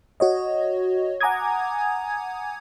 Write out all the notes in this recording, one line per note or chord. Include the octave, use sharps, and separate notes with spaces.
F#4 C#5 D#5
F#5 G#5 A#5 D6 D#6 G#6